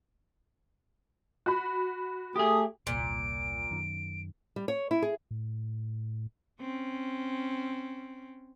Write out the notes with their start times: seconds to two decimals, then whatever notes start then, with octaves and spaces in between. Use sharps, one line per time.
1.46 F#4 B5
2.36 A3 G4 G#4 D#6
2.87 E1 C2 A#2 D7
3.71 F#2 D#3
4.56 G3
4.68 C#5
4.91 E4
5.02 G#4
5.31 A2
6.61 C4 C#4